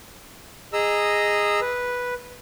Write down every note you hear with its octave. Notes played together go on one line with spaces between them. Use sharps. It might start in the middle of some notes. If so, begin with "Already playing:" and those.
G#4 D#5 A#5 E6
B4